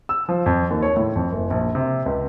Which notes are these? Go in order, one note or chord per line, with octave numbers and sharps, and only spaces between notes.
E6
F3
F2
D#2
C#5
A2
F2
F#1
A#1
C3
C#2